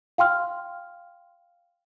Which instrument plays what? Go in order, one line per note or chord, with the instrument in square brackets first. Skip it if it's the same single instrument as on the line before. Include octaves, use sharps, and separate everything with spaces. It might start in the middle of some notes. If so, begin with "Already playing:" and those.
[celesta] F5 G5 C6 F6